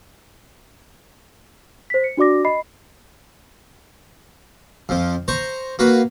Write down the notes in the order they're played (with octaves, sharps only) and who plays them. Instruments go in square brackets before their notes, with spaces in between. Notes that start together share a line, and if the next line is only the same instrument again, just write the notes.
[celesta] C5 B6
C#7
D4 F#4 D5 D6 A#6
D#5 B5 C7
[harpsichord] F2 F3
C5 A#5 C#6
A#3 F#4 B4